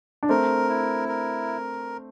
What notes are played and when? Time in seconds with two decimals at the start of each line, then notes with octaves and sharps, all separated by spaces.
0.23 D4
0.29 A3 C4 A#4
0.69 E4
1.09 A#4